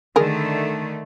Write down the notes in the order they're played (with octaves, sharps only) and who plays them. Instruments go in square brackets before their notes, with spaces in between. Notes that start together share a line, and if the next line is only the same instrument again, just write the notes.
[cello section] D3 D#3 A3 [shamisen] G#4 A#4